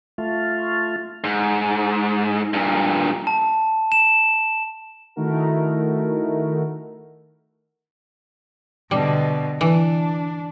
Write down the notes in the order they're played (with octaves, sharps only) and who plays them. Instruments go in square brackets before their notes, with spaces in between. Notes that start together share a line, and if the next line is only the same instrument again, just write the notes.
[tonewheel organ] A3 F4
[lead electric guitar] G#2
G2 A#2
[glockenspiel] A5
E7
[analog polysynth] D#3 A3 D#4 E4 F#4 A#4
[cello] B2 D3 [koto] G3
[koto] E3 [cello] D4